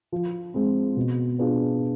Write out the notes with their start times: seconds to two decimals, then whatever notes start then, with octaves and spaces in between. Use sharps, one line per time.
0.12 F3
0.54 G#3 C4
0.96 B2
1.38 B3 D4 F4 G#4